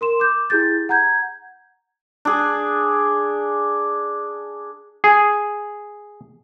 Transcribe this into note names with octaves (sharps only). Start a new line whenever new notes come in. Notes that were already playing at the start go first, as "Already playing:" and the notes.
A#4 C6 E7
D6 G6
E4 G4 G#4 G6 A6
F#5 A#5 G6 G#6
D4 G#4
G#4